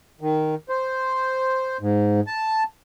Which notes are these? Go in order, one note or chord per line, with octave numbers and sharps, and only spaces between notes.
D#3
C5
G#2
A5